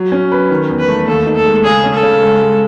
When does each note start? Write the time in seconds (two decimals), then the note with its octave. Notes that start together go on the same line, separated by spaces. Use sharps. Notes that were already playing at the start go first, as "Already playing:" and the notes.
Already playing: F#3
0.12 C#4
0.32 B4
0.50 D#3
0.70 E2
0.79 B4
0.88 A3
1.08 D#2 A4
1.27 D#4
1.36 A4
1.46 G#3
1.64 C#3 G#4
1.84 C#4
1.94 A4
2.03 C#3
2.22 G#3
2.42 G#3